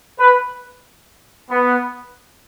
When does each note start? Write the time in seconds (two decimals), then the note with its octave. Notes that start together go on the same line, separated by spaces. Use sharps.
0.18 B4
1.49 B3